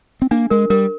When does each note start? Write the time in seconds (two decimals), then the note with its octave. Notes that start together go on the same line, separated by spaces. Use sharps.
0.22 C4
0.31 A#3 D4
0.50 G#3 A#4
0.70 G3 A#4